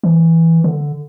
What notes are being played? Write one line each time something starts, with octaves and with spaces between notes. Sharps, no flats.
E3
D3